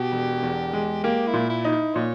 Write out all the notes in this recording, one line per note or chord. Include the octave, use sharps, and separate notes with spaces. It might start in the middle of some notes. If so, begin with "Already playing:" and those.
Already playing: B2 G4
E1
E2
G#3
A#3 G4
E4
A#2
E4
D#4
E4
A#2 C#5